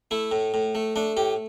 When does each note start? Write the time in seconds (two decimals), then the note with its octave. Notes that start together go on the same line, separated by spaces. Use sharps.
0.11 A3 E4
0.32 A2
0.54 A2
0.75 A3
0.96 A3 D4
1.17 A2 G4